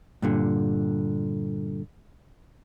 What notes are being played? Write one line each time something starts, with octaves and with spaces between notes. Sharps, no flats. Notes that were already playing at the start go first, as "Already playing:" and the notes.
G2 A#2 D3